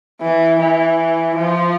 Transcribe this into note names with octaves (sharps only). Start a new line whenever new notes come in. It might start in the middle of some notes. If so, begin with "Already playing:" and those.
E3
E3
F3